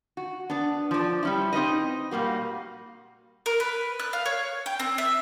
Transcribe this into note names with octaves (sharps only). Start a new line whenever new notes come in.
F#4
B3 D4
F3 D5
G3 C#4 E4
C4 D#4 B4 D#5
A#2 G3 A#3 F#4
A#4
B4
F#6
F5
C#5
G5
C4
E5